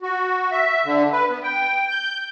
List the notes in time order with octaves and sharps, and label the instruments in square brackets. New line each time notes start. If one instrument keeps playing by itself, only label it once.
[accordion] F#4
E5
D3
B4
B3
G5
G6